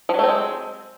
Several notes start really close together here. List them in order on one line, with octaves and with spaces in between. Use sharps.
F3 F#3 A3 C4 G#3